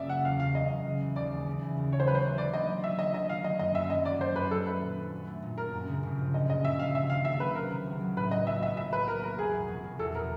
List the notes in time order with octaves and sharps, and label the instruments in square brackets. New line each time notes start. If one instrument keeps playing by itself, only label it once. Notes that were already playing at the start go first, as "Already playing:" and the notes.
Already playing: [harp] F#1 C#3 [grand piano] D5 E5
[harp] F#3 [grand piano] F#5
[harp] E2 [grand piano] F5
[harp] C#3 [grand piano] F5
[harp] F#1 [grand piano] D#5
[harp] F#3
C#3
E3
[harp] D#2 [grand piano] D5
[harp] G#3
C#3
E3
D#2
[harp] G#3 [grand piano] C#5
[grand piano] C5
[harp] F#3 [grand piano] B4
[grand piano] C5
[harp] A3
[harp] D3 [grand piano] D5
[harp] D4 [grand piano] D#5
[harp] F#3
[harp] A3 [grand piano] E5
[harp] D3 [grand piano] D#5
[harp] D4 [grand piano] D#5
[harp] D#3 [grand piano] F5
[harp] F#3 [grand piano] D#5
[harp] F#2 [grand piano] D#5
[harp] F#2 [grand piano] E5
[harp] D#3 [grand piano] D#5
[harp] F#3 [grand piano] D5
[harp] F#2 [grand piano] C5
[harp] F#2 [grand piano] B4
[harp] F#3 [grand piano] A4
[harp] A3 [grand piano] B4
[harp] A#2
D4
F#3
A3
A#2
[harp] D4 [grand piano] A#4
[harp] F#2
C#3
G1
F3
[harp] F#2 [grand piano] D#5
[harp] C#3 [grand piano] D#5
[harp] G1 [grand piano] E5
[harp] F3 [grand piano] F5
[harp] C3 [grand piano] E5
[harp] D#3 [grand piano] F5
[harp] C#2 [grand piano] E5
[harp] F#3 [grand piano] B4
[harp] C3 [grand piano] A#4
[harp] D#3
C#2
F#3
[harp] A2 [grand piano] B4
[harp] F#3 [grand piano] D#5
[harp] B1 [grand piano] E5
[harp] B3 [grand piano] E5
[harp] A2 [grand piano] E5
[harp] F#3 [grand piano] B4
[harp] B1 [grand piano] A#4
[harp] B3 [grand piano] A#4
[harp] E2 [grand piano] G#4
[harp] B2
F1
F1
[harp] E2 [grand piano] A4
[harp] B2 [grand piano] A#4